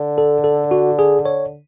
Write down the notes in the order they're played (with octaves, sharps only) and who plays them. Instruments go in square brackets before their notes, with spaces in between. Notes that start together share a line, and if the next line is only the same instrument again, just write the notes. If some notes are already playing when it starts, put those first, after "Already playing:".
Already playing: [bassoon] D3
[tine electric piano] A4
A4
F#4
G#4
C#5